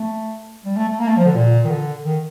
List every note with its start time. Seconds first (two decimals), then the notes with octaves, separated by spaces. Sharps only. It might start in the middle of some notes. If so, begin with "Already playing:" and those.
Already playing: A3
0.65 G3
0.76 A3
0.88 A3
0.99 A#3
1.08 A3
1.17 F3
1.26 D3
1.35 A#2
1.64 D#3
1.69 D3
2.05 D#3